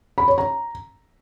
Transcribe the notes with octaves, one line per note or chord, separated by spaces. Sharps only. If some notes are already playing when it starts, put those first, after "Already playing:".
B5
C#5
A#5